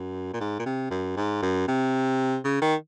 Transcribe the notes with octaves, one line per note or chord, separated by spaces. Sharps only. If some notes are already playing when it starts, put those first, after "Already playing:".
Already playing: F#2
A#2
G#2
A#2
C3
F#2
G#2
F#2
C3
C#3
D#3